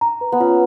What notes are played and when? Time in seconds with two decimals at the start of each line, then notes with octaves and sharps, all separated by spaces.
0.01 A#5
0.21 B4
0.32 B3
0.40 C#4 F4